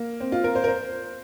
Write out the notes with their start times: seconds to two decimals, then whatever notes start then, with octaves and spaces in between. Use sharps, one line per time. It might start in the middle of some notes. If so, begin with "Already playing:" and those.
Already playing: A#3
0.20 C4
0.32 F4
0.44 A#4
0.55 C5
0.64 A#4
0.68 C5